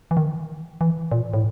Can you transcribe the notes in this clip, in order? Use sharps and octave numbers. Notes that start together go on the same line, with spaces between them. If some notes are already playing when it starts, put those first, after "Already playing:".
E3
D#3
E3
A#2
A2